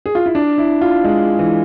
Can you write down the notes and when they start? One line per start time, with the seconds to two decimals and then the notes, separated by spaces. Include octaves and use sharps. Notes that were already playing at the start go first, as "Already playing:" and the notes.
0.06 G#4
0.15 F4
0.26 E4
0.35 D4
0.58 E4
0.81 F4
1.04 G#3
1.39 E3